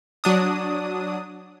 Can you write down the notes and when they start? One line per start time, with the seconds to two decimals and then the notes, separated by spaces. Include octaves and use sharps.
0.24 F#3 D4 D#6